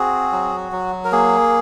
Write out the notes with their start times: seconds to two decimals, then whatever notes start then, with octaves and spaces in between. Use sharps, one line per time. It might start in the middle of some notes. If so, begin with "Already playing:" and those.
Already playing: C4 F#4 G#4
0.32 F#3
0.72 F#3
1.04 A#4
1.12 A#3 G#4